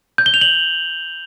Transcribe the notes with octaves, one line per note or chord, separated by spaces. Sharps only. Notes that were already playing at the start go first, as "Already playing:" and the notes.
G6
G7
F7
F#7